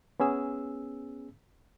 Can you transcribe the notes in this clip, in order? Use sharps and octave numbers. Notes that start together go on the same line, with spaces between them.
B3 C#4 G#4 E6